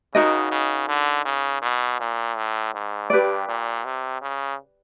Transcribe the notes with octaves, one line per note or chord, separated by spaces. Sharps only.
C#3 D#4 F#4 A#4 D#5
C#3
D3
C#3
B2
A#2
A2
G#2
G2 G4 B4 D5
A#2
C3
C#3